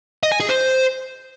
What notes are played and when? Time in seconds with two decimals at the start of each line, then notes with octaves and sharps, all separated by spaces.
0.23 D#5
0.32 G#5
0.40 G#4
0.49 C5